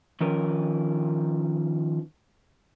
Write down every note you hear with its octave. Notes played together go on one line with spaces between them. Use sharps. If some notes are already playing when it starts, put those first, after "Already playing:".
D#3 F3 C#4 A#4 B4